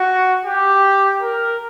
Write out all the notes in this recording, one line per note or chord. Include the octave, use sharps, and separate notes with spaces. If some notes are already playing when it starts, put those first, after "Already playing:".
Already playing: F#4
G4
A#4